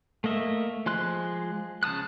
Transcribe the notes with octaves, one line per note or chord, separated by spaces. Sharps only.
A3 A#3 D#5 E5
F3 G#3 C6 F#6
C#3 A5 D#6 F#6